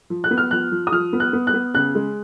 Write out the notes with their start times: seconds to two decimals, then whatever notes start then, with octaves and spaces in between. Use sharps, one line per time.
0.10 F3
0.24 F#6
0.31 B3
0.38 F6
0.51 F3 F#6
0.72 F3
0.87 D#6
0.92 F3 F6
1.13 B3
1.20 F#6
1.33 B3
1.47 F#6
1.54 B3
1.74 C#3 F#6
1.95 G#3